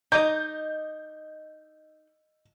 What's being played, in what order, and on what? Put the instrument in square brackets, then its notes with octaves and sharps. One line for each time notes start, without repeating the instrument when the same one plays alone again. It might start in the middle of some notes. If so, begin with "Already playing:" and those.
[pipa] D#4 [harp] D#5 D6 [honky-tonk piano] G6